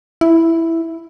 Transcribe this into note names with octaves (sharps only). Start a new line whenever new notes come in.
E4